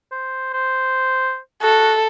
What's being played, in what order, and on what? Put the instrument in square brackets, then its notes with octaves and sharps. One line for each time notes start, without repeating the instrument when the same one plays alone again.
[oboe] C5
C5
[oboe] F#4 [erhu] A4